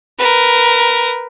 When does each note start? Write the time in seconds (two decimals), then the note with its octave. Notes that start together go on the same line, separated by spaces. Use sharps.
0.19 A#4 B4